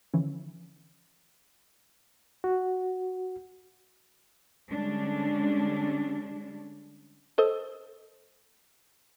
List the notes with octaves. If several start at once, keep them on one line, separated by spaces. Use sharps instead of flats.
D3 E3 F3 C#4
F#4
D3 G3 G#3 C#4 D4
A4 C5 D#5